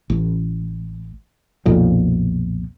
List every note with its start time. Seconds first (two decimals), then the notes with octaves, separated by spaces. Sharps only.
0.10 A1
1.65 B1 F2 A#2